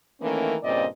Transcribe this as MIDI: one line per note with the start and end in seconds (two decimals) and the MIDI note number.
0.21 0.55 51
0.21 0.55 52
0.21 0.55 57
0.21 0.55 58
0.21 0.55 61
0.21 0.55 70
0.63 0.85 43
0.63 0.85 46
0.63 0.85 49
0.63 0.85 60
0.63 0.85 74
0.63 0.85 75